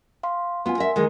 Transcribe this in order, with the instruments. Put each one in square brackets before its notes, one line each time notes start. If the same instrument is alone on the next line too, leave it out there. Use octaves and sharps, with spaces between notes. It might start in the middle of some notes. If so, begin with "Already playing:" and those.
[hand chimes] F5 C6
[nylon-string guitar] B3 F4 [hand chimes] G#5 C6
[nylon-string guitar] A#4 E5
D#3 E3 G#3